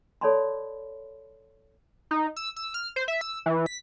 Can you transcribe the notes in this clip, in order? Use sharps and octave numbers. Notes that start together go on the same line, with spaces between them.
A4 C#5 D5 A5 B5 C6
D#4
E6
E6
F6
C5
E5
E6
E3
B6